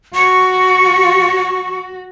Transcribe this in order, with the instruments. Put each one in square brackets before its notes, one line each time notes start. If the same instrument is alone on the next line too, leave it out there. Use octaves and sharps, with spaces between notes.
[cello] F#4 [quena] C#6